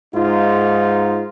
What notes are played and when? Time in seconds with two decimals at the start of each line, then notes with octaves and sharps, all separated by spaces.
0.14 G#2 D#4 F4